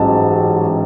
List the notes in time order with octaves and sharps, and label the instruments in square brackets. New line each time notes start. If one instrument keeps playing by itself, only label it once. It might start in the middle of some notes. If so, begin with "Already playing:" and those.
Already playing: [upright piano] A1 G#2 F#3 A5